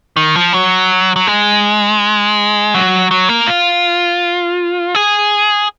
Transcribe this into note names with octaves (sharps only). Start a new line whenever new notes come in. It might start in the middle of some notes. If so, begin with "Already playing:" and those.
D#3
F3
F#3
F#3
G#3
F#3
F#3
A#3
F4
G#4